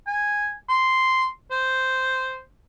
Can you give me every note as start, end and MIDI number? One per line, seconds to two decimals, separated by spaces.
0.07 0.53 80
0.69 1.26 84
1.51 2.41 72